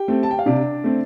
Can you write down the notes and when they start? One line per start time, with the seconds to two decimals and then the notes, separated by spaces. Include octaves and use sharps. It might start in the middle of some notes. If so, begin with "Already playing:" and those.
Already playing: G4 G5
0.08 A3 C4
0.23 A5
0.31 G5
0.39 F5
0.46 C3 D4 D5
0.84 A3 C4